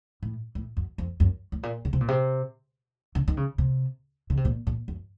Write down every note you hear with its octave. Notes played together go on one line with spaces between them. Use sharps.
A2
A2
F#2
F2
F#2
A2
A#2
C#3
C3
A#2
C3
C#3
D#3
C#3
C3
C#3
C3
A#2
A#2
F#2